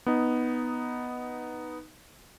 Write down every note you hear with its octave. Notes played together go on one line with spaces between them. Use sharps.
B3 D#4